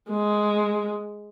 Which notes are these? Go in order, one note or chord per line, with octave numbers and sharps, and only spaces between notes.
G#3